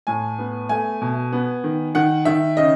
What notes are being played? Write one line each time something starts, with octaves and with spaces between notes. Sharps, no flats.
A2 G#5
B3
A3 G#5
B2
B3
D#3
D#3 F#5
D#3 E5
C#3 D#5